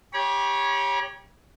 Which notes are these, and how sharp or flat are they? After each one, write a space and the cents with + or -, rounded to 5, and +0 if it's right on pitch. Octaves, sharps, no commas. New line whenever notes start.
G4 +15 C#5 +0 B5 -45